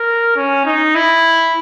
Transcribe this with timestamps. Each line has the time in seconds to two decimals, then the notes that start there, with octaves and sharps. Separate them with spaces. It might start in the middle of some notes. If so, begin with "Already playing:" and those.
Already playing: A#4
0.36 C#4
0.65 D#4
0.95 E4